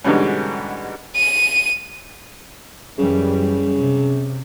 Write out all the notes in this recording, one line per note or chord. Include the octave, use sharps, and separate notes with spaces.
G#2 B2 D3 E3 G3 C#4
D#7
F#2 C#3 E3 G3
C3